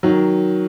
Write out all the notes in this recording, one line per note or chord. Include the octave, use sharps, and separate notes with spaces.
D#3 F#3